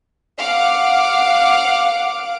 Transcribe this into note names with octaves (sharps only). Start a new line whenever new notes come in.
F5 F#5 D6